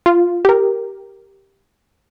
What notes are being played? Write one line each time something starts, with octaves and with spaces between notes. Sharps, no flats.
F4
G4 A#4